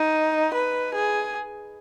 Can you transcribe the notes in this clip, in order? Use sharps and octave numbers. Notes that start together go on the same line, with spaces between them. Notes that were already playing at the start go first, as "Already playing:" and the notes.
Already playing: D#4
B4
G#4